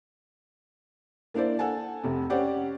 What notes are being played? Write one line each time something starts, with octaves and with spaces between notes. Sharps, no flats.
A#3 D4 E4 C5 D5
A4 F#5 G#5 A5
F1 C3
C#4 G4 C5 D5 F#5